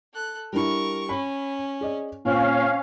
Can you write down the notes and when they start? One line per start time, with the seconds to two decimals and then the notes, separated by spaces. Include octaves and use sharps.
0.13 A4 F#6
0.53 G3 D4 E4 A#4 C#6
1.09 C#4 B5
1.81 G#4 D5 D#5
2.25 A#2 C4 C#4 F5